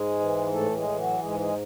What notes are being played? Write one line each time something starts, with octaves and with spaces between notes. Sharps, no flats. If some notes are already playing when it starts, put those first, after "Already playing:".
Already playing: G#2 G#3 G#4
E3
A2 A3 A4
G#3 G#4
E3
F#3 F#4
G#2 G#3 G#4
G#3 G#4